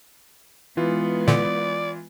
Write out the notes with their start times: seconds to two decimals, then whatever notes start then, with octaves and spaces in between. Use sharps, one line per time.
0.77 E3 G#3 B3 F4
1.28 A#2 D3 D5